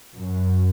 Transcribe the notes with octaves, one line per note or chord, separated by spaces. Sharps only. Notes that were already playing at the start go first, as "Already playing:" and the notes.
F#2